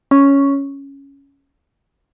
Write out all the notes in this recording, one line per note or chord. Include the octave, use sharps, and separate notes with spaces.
C#4